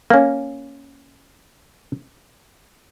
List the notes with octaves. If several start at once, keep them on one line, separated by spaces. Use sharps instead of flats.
A#3 C#4